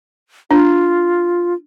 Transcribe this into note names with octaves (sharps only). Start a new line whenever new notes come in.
D4 F4